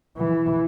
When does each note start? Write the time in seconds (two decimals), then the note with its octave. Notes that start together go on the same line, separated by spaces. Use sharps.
0.17 E3